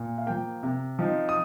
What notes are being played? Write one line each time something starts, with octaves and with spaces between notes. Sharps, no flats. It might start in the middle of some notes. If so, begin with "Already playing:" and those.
Already playing: A#2
F5
F3 A#3 G5
C3
F3 C4 D#4
D#6